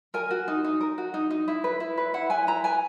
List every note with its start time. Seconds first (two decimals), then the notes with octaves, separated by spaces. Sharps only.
0.14 A#4 G#5
0.31 F#4
0.48 D#4
0.64 D#4
0.80 A#4
0.98 F#4
1.14 D#4
1.31 D#4
1.48 E4
1.64 B4
1.80 E4
1.98 B4
2.14 E4 F#5
2.30 B4 G#5
2.47 E4 A#5
2.64 B4 G#5